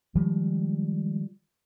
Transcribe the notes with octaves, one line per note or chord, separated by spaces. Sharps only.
D#3 F3 G3 G#3